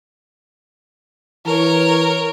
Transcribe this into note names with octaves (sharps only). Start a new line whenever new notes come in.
E3 A#4 C#5